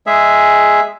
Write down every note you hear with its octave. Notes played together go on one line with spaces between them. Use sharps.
G#3 G#4 E5